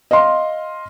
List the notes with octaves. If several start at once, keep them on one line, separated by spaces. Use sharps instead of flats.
D#5 F5 C6